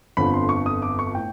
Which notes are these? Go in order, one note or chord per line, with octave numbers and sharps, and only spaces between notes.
G1 F2 D3 F3 B5
C6
C#6
D#6
D6
C#6
A2 G5